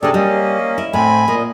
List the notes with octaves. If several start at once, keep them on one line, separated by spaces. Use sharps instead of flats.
G#2 C3 D4 G#4 A4 D5 D#5
G3 A#3 C#4 D#5
E4
A2 C4 G#5 B5
A#2 A#3 D#5